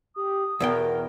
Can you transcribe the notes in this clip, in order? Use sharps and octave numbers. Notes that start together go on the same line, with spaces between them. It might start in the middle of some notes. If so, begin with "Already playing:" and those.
G4 D#6
E2 B2 A#4 G5